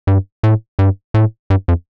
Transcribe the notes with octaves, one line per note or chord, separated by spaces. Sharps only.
G2
A2
G2
A2
G2
F2